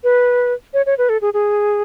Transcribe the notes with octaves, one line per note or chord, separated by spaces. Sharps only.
B4
C#5
C#5
B4
A4
G#4
G#4